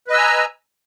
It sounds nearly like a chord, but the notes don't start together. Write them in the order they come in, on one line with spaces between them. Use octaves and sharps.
B4 D#5 E6 G#5 A#5